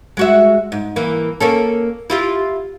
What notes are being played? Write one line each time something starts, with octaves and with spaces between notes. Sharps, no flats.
G#3 F#4 E5
G#2
E3 A#3
A#3 C#4 A4
E4 F4 G4